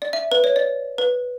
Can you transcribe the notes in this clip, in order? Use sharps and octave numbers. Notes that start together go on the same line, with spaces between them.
D5
E5
B4
C#5
D5
B4